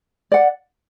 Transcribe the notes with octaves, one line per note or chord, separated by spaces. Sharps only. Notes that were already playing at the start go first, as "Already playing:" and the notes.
D5 F#5